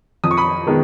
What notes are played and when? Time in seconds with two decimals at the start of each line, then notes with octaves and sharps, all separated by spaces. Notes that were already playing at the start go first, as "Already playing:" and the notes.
0.24 F2 D#6
0.31 C#6
0.37 B5 D#6
0.67 D#3 G#3 B3